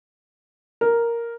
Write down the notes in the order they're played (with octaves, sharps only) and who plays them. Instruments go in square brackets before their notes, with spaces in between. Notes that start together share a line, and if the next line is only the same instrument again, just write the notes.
[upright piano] A#4